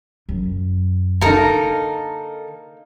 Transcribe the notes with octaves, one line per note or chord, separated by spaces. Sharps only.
F#2
D3 A#3 D#4 A4 A#4